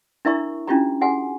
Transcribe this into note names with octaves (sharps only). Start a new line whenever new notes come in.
D4 E4 A#4 E5 A#5 C#6
C#4 D4 E4 F4 G4 A#5
F#4 G#4 F#5 G#5